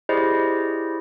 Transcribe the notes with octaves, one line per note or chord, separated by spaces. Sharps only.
E4 G4 G#4 C5 D5 D#5